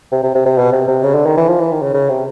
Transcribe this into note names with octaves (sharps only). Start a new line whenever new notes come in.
C3
C3
C3
C3
B2
C3
C3
C#3
D3
D#3
E3
F3
E3
D#3
C#3
C#3
C3